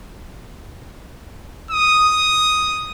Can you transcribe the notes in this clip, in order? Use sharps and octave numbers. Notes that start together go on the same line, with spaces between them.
D#6